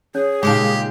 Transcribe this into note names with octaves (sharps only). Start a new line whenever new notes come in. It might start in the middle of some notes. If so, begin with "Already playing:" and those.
C#4 G#4 C#5
A#2 C#3 G#3 D#4 G4 G5